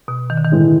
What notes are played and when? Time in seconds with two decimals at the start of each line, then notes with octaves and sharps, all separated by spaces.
0.08 B2
0.30 D#3
0.37 D3
0.45 D#3
0.52 A2 E3 G#3